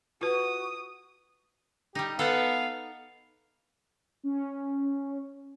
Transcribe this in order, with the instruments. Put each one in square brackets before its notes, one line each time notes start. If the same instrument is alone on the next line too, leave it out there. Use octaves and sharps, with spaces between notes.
[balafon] F4 B4 [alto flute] F#4 [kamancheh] D#6
[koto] G3 D#4 [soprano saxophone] G4
[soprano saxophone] B3 [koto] A4 F#5 A5 [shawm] F5
[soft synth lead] C#4